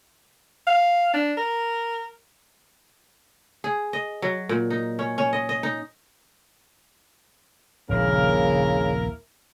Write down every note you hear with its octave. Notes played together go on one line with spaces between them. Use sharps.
F5
D4
A#4
G#4
D#5
F#3
A#2
D#4
C#4
C#4
D#5
D#5
D#4
D#1 A#1 C#3 A#3 E4 A#4